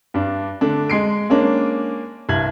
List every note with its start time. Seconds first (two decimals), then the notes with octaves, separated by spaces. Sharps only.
0.14 G2 D4
0.61 D3 A3 D4
0.90 G#3 C6 C7 D7
1.30 G#3 A#3 C#4 D4
2.29 C2 G2 G#6 F#7